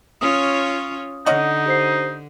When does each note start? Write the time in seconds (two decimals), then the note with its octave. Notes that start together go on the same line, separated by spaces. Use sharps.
0.21 C#4 F4 C#5 D#6
1.26 D3 C#4 D#4 D#5 F#5
1.66 G4 C5 C7